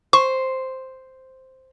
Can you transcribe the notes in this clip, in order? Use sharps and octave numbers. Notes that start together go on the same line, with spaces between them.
C5 C#6